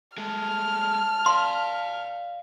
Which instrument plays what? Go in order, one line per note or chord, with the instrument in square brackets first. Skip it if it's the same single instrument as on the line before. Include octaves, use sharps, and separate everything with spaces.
[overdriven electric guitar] G#3 A3 [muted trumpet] A5 [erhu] F6
[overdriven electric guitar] D5 F5 [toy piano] C6